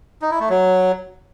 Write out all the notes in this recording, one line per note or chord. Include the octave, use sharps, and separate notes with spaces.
D#4
E4
A3
F#3